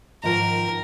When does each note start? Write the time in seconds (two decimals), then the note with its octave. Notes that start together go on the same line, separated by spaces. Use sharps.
0.23 G#2 D#3 F3 A#4